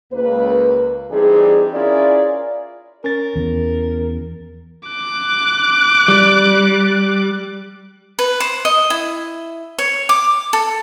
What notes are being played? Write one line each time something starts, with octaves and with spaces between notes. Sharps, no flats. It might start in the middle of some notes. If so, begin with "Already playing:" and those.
C#2 A#3 B4
E3 G3 C4 D4 D#4 G#4
C#4 E4 F4 G#4 A#4 D5
C#4 A#4 A6
E2
D6 F#6
G3
B4
C5
D#5
E4
C#5
D6
A4